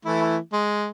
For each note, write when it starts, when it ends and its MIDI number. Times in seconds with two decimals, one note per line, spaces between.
0.05 0.37 52
0.05 0.37 57
0.05 0.37 64
0.53 0.89 56